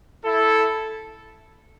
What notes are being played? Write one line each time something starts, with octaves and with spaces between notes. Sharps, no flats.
E4 A4